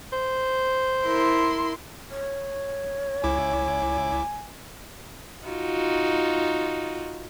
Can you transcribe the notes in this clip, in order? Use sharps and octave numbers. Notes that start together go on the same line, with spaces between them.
C5
E4 A#4 C6
C#5
C#2 E4 G#5 D6
D#4 F4 F#4